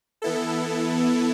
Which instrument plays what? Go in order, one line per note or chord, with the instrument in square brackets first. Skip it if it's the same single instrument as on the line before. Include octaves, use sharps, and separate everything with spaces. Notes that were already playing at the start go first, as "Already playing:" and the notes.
[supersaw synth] E3 B3 E4 A4